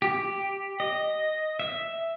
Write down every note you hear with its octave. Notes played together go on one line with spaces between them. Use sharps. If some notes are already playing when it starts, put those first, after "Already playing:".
G4
D#5
E5